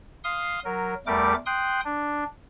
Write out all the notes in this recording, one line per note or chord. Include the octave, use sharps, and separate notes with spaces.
F5 C6 D#6
F#3 A#4
E2 G3 A3 A#4 D6
G5 C6 D#6 F#6
D4